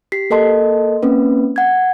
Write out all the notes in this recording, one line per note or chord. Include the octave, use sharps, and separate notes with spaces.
G4 B6 C7
A#3 A4 A#4 D#5 A5 C6
A#3 C4 C#4 B4
F#5 G#6